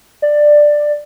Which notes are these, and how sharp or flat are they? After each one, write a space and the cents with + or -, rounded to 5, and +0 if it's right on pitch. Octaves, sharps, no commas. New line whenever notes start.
D5 +10